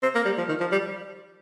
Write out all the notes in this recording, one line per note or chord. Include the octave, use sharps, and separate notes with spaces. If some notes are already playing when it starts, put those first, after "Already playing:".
C4
A#3
G3
F3
D#3
F3
G3